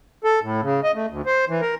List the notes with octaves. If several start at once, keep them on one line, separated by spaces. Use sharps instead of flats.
A4
A2
C#3
D#5
A3
D2
C5
E3
A#4